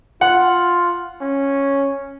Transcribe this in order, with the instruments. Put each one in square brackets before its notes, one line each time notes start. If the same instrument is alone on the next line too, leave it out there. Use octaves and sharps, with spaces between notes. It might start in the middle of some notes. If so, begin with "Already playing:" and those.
[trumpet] F4 [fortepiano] F#5
[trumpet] C#4